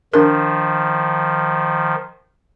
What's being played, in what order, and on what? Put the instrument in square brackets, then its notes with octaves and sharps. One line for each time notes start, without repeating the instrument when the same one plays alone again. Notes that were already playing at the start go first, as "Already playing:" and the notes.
[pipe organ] D#3 F3 [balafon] D4 A#4